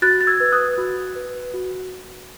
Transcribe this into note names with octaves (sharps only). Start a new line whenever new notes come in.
F#4 F#6 A6
A6
E6 G#6
B4
D#6 F#6
F#4
B4
F#4